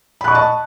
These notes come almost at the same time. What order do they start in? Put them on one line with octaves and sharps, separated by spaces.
B5 F#6 C#6 D#5 A5